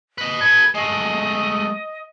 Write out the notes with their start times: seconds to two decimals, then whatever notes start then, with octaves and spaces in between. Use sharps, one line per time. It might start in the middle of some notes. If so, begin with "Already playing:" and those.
0.18 B4 D#5
0.41 A4 B4 G#6
0.75 G#3 A3 D#5